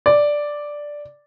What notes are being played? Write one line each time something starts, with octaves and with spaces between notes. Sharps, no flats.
D5